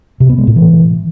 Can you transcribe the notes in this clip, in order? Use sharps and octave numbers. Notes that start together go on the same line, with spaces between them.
C3
B3
G#3
A2
E3